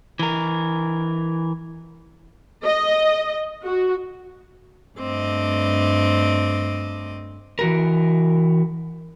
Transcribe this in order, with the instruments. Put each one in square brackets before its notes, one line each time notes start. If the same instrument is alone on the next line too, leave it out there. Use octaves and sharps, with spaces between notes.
[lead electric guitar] E3 A#4
[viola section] D#5
F#4
[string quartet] G2 A3 C4 D#5 D6
[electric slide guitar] E3 F#4 A#4